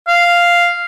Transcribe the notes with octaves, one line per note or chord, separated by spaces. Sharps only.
F5